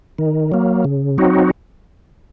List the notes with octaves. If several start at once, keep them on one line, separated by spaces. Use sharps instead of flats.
D#3
F#3 A#3
C#3
F#3 C4 D#4 F#4